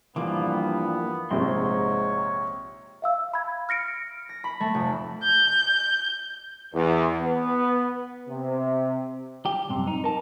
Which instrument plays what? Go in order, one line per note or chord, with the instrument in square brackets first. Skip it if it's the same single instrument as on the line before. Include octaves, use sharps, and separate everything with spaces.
[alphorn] G2 [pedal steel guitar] E3 F3 A#3 [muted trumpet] B3 [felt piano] D6
[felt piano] A#1 C3 [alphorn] G#2 [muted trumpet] C#5 [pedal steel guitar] C6
[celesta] E5 F5 E6
B5 G#6
F6 A#6 C#7 D7
[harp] A#6
B5
A3
F1
[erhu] G6
[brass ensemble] E2
B3
C3
[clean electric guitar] G4
C2 F#2 C3
D#4
A#4 A5